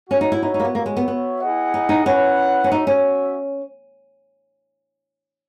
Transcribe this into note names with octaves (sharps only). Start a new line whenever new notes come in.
C#4 F#4 C#5 E5
D#4
E4
D#4
D#4
A#3
B3
A#3 F#4 C#5 E5
G#3
B3
B3
E4 G#4 D#5 F#5
D#4
D#4
C#4 E4 B4 F#5
C#4
D#4 F#4 C#5 E5
C#4